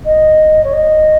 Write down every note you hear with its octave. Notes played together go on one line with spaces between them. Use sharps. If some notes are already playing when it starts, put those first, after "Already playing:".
D#5
C#5
D#5